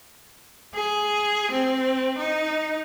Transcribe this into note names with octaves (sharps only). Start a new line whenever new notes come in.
G#4
C4
D#4